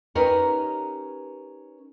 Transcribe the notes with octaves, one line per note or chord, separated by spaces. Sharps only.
C#4 D#4 G4 A#4 B4 C#5